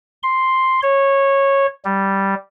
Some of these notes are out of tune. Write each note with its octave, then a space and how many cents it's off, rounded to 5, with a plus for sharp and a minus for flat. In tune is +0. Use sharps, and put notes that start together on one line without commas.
C6 +0
C#5 -15
G3 -5